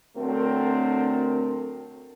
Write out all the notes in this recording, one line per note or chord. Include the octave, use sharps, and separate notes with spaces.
D3 F#3 A3 C4 A4 A#4